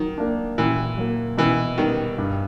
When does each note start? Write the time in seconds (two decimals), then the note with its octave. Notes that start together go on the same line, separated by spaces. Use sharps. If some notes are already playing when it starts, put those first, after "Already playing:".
Already playing: D#3 F#3
0.18 A#3 D4
0.58 A#2 E3
0.98 F#3 A#3
1.38 B2 E3
1.78 D#3 G3 B3
2.18 G2